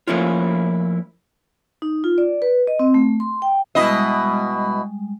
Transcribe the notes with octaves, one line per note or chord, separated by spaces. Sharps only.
F3 A3 A#3 C#4 E4 F4
D#4
F4
D5
B4
D#5
C4
A3
C6
G5
B2 G3 G#3 E4 D#5